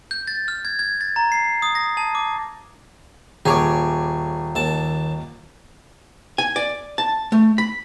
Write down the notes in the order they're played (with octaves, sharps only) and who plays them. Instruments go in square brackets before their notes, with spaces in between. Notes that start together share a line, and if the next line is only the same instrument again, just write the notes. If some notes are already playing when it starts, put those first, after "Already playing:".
[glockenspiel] G6
A6
F6
G#6
G#6
A6
A#5
C7
D#6
A#6
A5
D6
[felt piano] D#1 D6 [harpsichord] G#4 C#5
[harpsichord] D#2 A5
[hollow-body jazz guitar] G#5
D5
A5
A3
B5